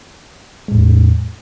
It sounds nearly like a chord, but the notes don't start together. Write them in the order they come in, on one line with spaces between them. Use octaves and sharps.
G#3 A2 E2